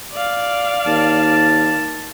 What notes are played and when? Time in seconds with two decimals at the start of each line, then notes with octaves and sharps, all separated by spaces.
0.12 D5 F5
0.86 D#2 A5